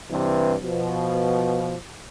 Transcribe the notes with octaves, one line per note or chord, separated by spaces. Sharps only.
G2 C3 E3
B2 F3